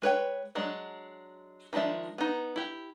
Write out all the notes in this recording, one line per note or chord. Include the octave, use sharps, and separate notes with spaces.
G#3 B4 C#5 G5
F#3 G#3 D4
D#3 F3 G#3 D4 E5
B3 D#4
E4 G4